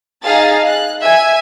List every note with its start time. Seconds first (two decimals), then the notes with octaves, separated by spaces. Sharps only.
0.23 D#4 G#4 F5 G#5 A5 A6
0.66 F#6
1.02 E5 G#5 G#6